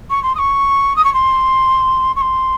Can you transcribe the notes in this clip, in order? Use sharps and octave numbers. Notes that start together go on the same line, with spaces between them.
C#6
C6
D#6
C#6
D#6
C#6
C6
C#6
C6